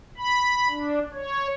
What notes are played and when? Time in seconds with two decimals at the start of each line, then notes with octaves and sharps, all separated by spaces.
0.18 B5
0.69 D4
1.14 C#5